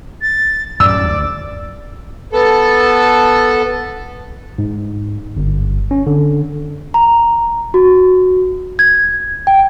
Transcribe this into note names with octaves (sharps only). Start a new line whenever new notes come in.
A6
F#2 A2 F#3 D5 E6
D2
B3 A4
G#2
G1
C#4
D3
A#5
F#4
G#6
G5